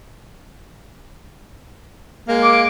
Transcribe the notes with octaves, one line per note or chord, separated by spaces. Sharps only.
G#3 A#3
D6